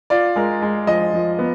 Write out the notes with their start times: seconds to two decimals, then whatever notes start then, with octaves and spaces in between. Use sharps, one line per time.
0.10 F4 D5
0.36 G#3 A#4
0.62 G#3
0.87 F3 D#5
1.14 F3
1.39 B3